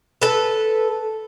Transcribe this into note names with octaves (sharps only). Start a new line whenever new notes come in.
A4 B4